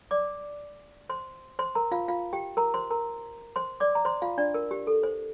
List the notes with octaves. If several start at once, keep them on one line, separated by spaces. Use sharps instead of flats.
D5 D6
C5 C6
C5 C6
A#4 A#5
F4 F5
F4 F5
G4 G5
A#4 A#5
C5 C6
A#4 A#5
C5 C6
D5 D6
A#5
C5 C6
F4 F5
D4 D5
A#4
G4
A4
C5